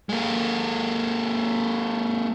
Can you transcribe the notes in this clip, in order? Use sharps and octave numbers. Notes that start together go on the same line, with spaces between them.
G#3 A#3